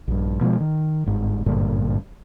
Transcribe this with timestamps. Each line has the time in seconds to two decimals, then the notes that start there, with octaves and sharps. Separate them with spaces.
0.08 A#1 G2
0.41 B2 F3 G3 G#3
0.60 D#3
1.06 G1 G#2
1.46 G#1 G2 A#2 D3